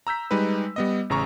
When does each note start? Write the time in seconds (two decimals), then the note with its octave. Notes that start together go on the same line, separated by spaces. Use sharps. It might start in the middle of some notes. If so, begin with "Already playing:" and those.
0.07 A#5 E6 G6 B6
0.31 G3 G#3 D#4 B4
0.76 G3 B3 D#5
1.10 A1 C#3 A#5 C#6